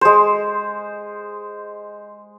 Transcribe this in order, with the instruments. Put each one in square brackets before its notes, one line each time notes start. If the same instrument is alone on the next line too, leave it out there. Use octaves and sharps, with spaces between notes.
[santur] G#3 C5